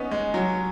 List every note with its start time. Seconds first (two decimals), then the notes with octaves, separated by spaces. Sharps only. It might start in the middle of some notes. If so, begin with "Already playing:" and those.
Already playing: B3 C#4 D#4
0.11 G#3
0.34 F#3